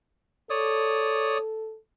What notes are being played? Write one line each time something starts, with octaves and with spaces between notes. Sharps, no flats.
A4 C#5 D5 D#6